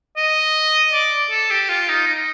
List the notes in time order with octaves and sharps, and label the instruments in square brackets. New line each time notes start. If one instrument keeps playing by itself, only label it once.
[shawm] D#5
D5
A4
G4
F4
D#4
D#4